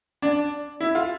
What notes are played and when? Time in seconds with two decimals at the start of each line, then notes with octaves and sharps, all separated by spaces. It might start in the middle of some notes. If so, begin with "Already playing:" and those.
0.22 D4
0.81 E4
0.95 F4